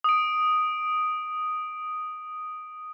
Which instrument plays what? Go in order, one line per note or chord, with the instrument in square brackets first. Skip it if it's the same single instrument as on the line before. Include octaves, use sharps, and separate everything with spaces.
[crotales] D#6 D7